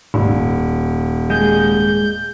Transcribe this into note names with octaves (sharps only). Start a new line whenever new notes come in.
D#1
G#3 G6